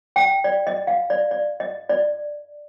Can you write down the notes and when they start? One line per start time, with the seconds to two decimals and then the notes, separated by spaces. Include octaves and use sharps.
0.16 G5
0.44 D5
0.67 D#5
0.87 F5
1.10 D5
1.31 D5
1.60 D#5
1.90 D5